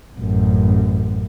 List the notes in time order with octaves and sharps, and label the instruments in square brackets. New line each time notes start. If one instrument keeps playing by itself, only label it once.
[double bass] A1 F#2